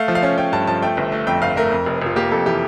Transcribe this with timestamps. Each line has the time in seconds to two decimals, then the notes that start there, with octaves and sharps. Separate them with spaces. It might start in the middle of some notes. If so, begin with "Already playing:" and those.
Already playing: A3 F5
0.08 F3
0.15 F5
0.23 C#4
0.38 C#4 G5
0.52 G2 A5
0.67 F3 A5
0.82 A3 G5
0.97 G1
1.12 A3
1.27 F2 G5
1.42 G1 F5
1.57 A3 A#4
1.72 F2
1.86 F1
2.02 F1 F4
2.16 A#3 G4
2.31 F2 A4
2.46 E3 G4